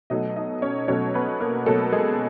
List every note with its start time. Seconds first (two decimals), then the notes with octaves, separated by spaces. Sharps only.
0.10 B2 F#3 A3 D#4 D#5
0.36 D#4 D#5
0.62 C#4 C#5
0.88 B2 F#3 A3 C#4 C#5
1.14 B3 B4
1.40 A#3 A#4
1.66 B2 F#3 A3 A4
1.92 G#3 G#4